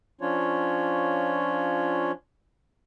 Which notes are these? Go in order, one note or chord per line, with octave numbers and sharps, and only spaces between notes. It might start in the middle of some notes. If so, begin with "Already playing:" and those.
F3 C#4 D4 F4 C#5